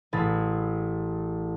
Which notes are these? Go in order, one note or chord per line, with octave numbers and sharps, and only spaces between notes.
A1 G#4 B5 A6